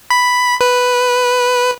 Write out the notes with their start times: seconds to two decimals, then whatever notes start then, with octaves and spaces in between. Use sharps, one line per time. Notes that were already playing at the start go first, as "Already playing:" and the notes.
0.10 B5
0.61 B4